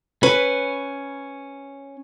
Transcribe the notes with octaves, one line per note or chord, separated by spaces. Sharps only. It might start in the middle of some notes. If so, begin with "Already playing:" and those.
C#4 B4